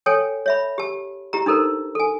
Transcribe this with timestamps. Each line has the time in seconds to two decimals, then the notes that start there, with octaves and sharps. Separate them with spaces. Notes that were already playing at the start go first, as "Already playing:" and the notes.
0.06 A4 C#5 G5 G#5
0.46 C#5 E5 B5
0.78 G4 A5
1.33 E4 G4 A#5
1.46 D4 D#4 A4 A#4 C5
1.95 A4 G#5